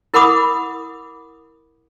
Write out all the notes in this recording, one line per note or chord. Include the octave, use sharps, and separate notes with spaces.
E4 A#4 F#5 B5 D6 D#6